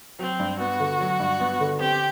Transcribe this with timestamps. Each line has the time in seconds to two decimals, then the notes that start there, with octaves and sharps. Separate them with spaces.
0.19 F#3 C4
0.40 G2
0.60 B3 F#4
0.80 D3
1.00 F#3
1.20 G2
1.40 B3
1.60 D3
1.80 C4 G4